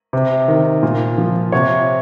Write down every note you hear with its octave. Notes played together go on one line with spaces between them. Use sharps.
C3
D#3
A#2
F3
C3 C#5